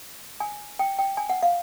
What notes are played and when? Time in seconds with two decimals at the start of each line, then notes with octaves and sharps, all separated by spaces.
0.40 G#5
0.79 G5
0.99 G5
1.17 G#5
1.30 F#5
1.43 F5